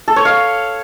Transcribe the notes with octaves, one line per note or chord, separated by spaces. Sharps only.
A4
C#5
F5